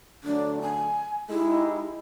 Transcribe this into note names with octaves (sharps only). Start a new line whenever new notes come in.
D3 F#3 A3 D4
G#5
G#3 D#4 E4 G4